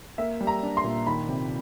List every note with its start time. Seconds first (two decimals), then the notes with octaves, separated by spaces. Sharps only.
0.18 A#3 E5
0.41 G3
0.47 A#5
0.63 D4
0.77 C6
0.84 A#2
1.06 D#3 B5
1.29 C3